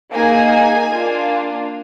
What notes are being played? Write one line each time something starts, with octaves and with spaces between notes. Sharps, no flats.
A#3 D#4 G#4 G#5
A#3 D4 F4